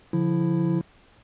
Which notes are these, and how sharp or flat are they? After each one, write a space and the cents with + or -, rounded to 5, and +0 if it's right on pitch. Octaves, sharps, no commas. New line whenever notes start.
D3 -35 F3 +0 E4 +5